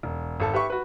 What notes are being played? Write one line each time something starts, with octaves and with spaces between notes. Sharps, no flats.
E1
G#1 A4 A5
G4 B4 E5 C#6
F#4 B4